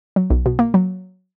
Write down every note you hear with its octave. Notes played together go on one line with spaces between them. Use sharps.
F#3
B1
B2
A#3
F#3